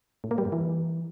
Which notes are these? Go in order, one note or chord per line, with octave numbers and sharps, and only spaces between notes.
A2
A#3
G3
G2
E3